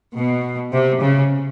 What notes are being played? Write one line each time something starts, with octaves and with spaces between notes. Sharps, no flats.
B2
C3
C#3